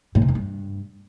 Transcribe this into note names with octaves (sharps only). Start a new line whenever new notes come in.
A2
C3
F2
G2